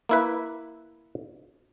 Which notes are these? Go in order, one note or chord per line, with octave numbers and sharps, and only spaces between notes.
A#3 E4 B4